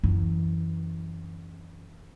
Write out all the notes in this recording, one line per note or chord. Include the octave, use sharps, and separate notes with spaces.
F#2 E3